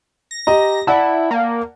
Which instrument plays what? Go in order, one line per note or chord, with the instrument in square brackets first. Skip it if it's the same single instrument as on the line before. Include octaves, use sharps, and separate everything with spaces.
[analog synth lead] A#6
[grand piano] G4 D#5 A#5
[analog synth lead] E4 [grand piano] D5 F#5 A5
[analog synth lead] A#3